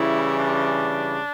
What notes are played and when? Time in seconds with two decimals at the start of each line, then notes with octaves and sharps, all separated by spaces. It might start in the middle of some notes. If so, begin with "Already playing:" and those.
Already playing: C#3 E3 G3 E4
0.38 D4